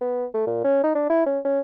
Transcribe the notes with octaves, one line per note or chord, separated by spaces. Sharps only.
B3
A3
A#2
C#4
D#4
D4
E4
C#4
C#4